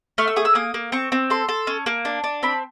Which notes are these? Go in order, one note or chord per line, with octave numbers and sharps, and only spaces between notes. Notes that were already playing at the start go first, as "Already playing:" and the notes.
A3 F6
E6
G#4 D#6
E6
A#3 D#6
A#3
C4 C#6
C4
A4 C6
A4
C#4
A#3
D4
D4
C4 B5